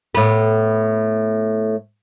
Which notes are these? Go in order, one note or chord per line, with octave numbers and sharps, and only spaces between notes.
A2 B3